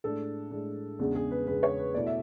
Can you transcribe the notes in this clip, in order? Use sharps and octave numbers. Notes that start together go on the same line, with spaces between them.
A2 G#3 D4 A4
A2 G#3 D4
E2 C#3 G#3 D4
G#4
B4
E2 C#3 G#3 D4 B4
C#5
B4
B2 A3 E4 D5
E5